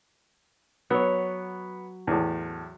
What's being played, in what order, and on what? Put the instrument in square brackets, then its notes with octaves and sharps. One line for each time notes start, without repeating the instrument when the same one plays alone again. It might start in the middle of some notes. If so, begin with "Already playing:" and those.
[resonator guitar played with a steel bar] F#3 C#5 [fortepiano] B3
[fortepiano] E2 A2